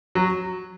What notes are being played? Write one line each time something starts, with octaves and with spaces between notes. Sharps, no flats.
F#3